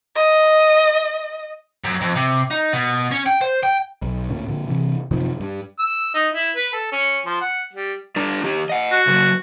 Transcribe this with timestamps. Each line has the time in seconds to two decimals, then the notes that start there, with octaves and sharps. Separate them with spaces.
0.15 D#5
1.84 F#2
2.01 F2
2.16 C3
2.51 D#4
2.73 B2
3.11 C#4
3.26 G5
3.41 C5
3.63 G5
4.02 B1
4.30 D2 A#2 C#4
4.48 A#2 D3
4.68 C3 E3
5.11 F#2 C3 D#3 F3
5.40 G2
5.79 E6
6.15 D#4
6.34 E4
6.56 B4
6.73 A4
6.92 C#4
7.26 F3
7.41 F#5
7.73 G3
8.16 G3 D4 A#5
8.44 D#3 G4
8.69 D#5 F#5
8.92 F#4
9.07 C#3 F#3